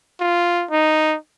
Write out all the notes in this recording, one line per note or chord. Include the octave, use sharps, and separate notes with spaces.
F4
D#4